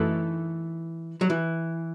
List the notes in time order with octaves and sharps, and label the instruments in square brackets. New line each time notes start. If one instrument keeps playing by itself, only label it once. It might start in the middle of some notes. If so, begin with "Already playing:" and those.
Already playing: [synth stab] F#2 A3 D#4 A4 [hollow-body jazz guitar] E3
[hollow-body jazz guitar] F#3
E3